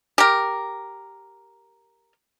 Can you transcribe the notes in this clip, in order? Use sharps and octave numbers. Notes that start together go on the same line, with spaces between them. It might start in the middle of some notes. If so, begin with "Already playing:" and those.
G4 A#4